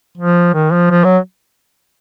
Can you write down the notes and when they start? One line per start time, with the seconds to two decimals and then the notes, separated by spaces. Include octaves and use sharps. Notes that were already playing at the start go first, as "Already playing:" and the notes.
0.18 F3
0.54 D#3
0.73 F3
0.91 F3
1.04 F#3